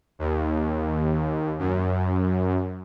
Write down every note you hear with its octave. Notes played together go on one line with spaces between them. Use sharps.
D#2
F#2